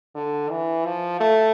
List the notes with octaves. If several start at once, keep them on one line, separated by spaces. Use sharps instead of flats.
D3
E3
F3
A3